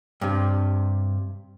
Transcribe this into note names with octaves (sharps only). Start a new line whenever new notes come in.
G2 C3